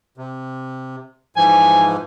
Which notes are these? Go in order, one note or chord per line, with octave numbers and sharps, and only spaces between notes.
C3
G#2 E3 F3 G#5